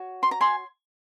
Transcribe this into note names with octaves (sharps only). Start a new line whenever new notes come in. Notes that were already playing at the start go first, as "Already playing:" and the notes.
Already playing: F#4 C#5
C6
A#5
G#5 C6